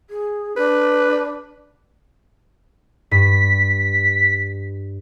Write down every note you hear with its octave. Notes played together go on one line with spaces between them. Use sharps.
G#4
D4 B4
G2 B6